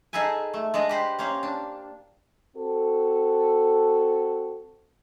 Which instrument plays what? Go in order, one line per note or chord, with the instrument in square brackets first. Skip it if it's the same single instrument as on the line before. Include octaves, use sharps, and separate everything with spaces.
[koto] D#4 G#4 A4 B4 G#5
A3
G#3 D4 D5 D#5
G4 B4 C5
A#3 C#4 C5 F5
D4
[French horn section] C4 F#4 A4